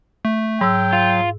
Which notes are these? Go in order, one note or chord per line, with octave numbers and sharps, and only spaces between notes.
A3
G#2 F#3 G5 E6
F4